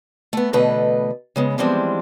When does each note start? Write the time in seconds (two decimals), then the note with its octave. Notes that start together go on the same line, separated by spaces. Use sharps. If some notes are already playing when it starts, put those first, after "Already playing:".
0.33 A3 B3
0.53 E2 B2 D3 A3 B4 D#5
1.36 C#3 G#3 B3
1.58 E3 F3 G3 G#3 C4 D4